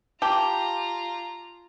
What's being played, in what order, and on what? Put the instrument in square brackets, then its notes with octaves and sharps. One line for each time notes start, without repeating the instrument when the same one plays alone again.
[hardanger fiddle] F4 A#5 [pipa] G4 [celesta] A5 D6